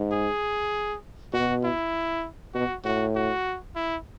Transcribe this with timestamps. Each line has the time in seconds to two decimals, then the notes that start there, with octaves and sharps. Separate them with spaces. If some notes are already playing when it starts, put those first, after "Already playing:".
Already playing: G#2
0.12 G#4
1.33 B2 F#4
1.64 E4
2.54 B2 F#4
2.85 A2 F#4
3.15 F#4
3.75 E4